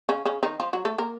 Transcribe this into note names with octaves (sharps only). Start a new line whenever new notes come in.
C#3 C#4
C#3 C#4
D#3 D#4
F3 F4
F#3 F#4
A3 A4
A#3 A#4